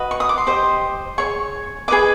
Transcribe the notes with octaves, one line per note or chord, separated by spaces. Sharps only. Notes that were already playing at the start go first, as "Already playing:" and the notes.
Already playing: F#4 B4 D#5
C#6
D#6
D6
C6
G4 C5 D#5
G#4 C#5 C#6
G#4 B4 D#5 D6